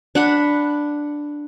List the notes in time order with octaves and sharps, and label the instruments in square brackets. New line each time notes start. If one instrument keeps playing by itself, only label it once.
[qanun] D4 F#5 B5